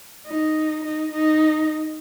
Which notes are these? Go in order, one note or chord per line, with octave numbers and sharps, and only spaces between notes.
D#4
D#4
D#4